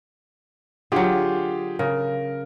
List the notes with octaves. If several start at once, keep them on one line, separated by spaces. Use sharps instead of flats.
D3 F#3 F4 G4 G#4
C#3 A#4